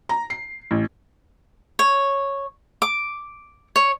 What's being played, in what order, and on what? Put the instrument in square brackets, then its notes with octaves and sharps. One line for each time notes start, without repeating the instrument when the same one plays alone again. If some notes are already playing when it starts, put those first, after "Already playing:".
[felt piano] A#5
C7
A1
[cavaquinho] C#5
D6
C#5